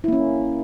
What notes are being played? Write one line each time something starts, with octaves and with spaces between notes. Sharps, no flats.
A#3 C#4 E4